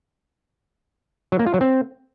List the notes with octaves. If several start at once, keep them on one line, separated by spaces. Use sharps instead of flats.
F#3
A#3
F4
F#3
C4